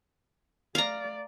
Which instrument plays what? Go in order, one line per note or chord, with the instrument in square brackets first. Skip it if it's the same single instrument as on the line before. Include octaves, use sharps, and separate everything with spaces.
[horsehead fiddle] A3 D5 [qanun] F5 A#5